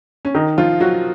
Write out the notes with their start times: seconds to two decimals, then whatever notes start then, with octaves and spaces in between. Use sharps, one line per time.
0.25 C#4
0.35 D#3 D#4
0.58 F3 F4
0.80 F#3 F#4